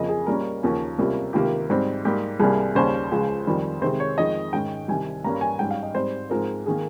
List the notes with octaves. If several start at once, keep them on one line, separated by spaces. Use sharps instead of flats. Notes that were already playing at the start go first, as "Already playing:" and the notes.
Already playing: F2 C#3 F3 A#3 D#5
G#4
A#2 G3 A#3 C#4 A#4
D#2 C#3 F3 A#3 C#4
C#2 C3 G3 A#3 C#4
C#2 C3 D#3 A#3 G4
G#2 G3 C4
G#2 G3 A#3 G4
C2 C3 G3 A#3 G#4
D#2 C#3 G3 C#4 C5
C#2 C#3 F3 G#3
F2 D#3 G3
C3 D#3 G#3 C4 C5
C#5
F2 D#3 G#3 D#5
G#2 D#3 G#3 C#4 G5
C2 C3 D#3 G#5
G2 G3 A#3 C#4 A#5
G#5
G#2 G3 C#4 G5
F5
D#5
G#2 G3 C4 C5
G#2 F3 G#3 C4 A#4
D#3 A#3 G#4